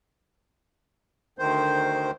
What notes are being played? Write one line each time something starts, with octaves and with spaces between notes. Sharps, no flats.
D2 D#3 C5